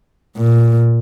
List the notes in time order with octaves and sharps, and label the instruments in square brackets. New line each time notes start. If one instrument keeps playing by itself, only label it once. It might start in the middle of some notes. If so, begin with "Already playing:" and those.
[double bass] A#2